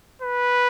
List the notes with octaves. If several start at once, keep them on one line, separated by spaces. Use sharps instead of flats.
B4